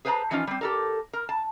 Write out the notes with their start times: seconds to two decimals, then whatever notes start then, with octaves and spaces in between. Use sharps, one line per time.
0.05 G#4 B4 C5 F5 A5 A#5
0.31 E3 F3 C#4 D#4 F4
0.47 G3 C4
0.61 G4 A4 A#4
1.13 A#4
1.29 A5